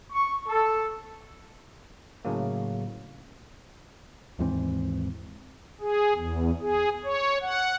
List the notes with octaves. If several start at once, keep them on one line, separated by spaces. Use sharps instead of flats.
C#6
A4
A2 C#3 F#3 A#3
D#2 G#2 E3 C4
G#4
E2
G#4
C#5
F#5